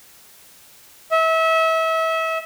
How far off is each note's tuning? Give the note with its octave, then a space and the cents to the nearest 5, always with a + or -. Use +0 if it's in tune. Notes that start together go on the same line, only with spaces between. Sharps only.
E5 -30